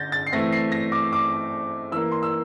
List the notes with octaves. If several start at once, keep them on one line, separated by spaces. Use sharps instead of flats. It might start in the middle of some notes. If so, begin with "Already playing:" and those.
Already playing: D3 G6 A6 A#6
A6
C7
E3 A3 C4 A#6
C7
A#6
D6
D6
E3 A#3 E6
C6
E6